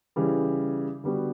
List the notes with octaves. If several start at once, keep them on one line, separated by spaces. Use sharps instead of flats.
C#3 E3 G3
D3 G3 B3 F#4